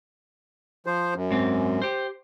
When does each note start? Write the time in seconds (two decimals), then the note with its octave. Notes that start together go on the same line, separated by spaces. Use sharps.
0.86 F3 C5
1.15 F#2
1.31 G#2 C4
1.82 G4 C5